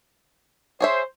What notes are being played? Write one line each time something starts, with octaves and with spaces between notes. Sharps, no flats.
G#4 C5 C#5 E5